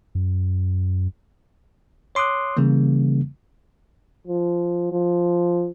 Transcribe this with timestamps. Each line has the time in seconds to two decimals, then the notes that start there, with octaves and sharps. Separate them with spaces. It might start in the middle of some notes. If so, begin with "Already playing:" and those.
0.15 F#2
2.15 C#5 C6 D6 D#6 F#6
2.57 C#3 E3 G3 A#3
4.27 F3
4.92 F3